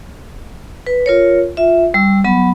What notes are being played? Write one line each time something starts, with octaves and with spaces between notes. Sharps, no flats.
B4
F4 A#4 C#5
F4 E5
G3 E6
F#3 B3 B5